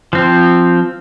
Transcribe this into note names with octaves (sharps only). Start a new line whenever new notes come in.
F3 C4